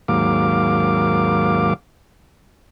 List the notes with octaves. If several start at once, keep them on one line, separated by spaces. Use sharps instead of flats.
D#2 G#2 F#3 A#3 F5 D6